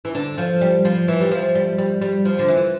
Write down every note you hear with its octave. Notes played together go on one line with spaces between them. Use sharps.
E3
D3
F3
G3
F3
E3
G3
F3
G3
G3
G3
F3
D3
E3